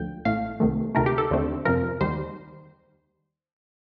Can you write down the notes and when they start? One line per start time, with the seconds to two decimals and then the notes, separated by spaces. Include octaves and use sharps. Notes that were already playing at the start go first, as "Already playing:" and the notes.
Already playing: D2 D3 F3 G5
0.25 A1 A2 A3 F5
0.60 C2 C3 D#3 A3
0.95 D2 C3 D#3 A3 A#4
1.06 G4
1.18 A4
1.30 D#2 D3 A3 C4
1.65 F2 C3 F3 A#4
2.01 D#2 D#3 G3 C5